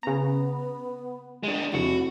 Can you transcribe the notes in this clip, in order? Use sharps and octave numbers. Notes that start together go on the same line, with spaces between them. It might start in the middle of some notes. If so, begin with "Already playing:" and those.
C#3 B3 A#5
G#3 D4
F1 E4 F#4 C#7